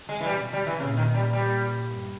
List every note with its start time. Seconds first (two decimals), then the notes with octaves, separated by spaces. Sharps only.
0.09 G#3
0.20 E3
0.26 B2 G3
0.53 G3
0.66 E3
0.80 A#2 C#3
0.97 D#3
1.15 G3
1.33 A#2 G3
1.87 G2